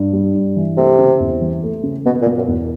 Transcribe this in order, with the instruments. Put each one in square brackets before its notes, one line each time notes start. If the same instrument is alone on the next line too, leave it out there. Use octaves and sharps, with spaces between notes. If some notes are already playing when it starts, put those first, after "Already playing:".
Already playing: [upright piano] G2
G3
G2
E3
[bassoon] C3 [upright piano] A3
[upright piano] C#3
E2
E3
A3
C#3
[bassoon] B2 [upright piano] B3
[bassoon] A#2
[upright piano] B2
[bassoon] F#2
[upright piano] E2